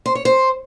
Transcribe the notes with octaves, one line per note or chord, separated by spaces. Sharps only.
C5
C#5
C5